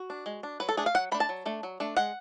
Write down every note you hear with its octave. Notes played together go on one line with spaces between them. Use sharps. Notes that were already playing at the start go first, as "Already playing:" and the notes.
Already playing: F#4
D4
G#3
D4
F#3 B4
A4
A3 D4 G#4
F5
F#3 F#5
A3 D4 B5
A5
F#3
A3 D4
F#3
A3 D4
G#3 F#5